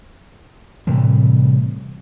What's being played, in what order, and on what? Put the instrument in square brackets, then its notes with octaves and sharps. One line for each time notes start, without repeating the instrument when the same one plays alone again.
[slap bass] A2 C3 E3 G3